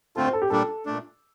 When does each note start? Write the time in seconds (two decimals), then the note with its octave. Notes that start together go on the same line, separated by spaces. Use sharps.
0.16 D3 A3 C4 F4 A4
0.25 C5
0.33 A4
0.42 G4
0.50 A#2 G3 D4 A4
0.86 A#2 A3 D4